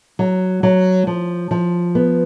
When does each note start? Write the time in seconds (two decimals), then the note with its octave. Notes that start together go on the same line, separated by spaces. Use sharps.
0.19 F#3
0.63 F#3
1.07 F3
1.51 F3
1.95 B3